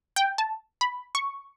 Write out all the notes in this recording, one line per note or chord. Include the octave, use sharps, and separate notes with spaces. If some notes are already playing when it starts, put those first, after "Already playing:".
G5
A5
B5
C#6